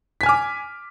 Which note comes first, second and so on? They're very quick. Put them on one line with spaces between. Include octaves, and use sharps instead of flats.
B6 G#5 F6 D6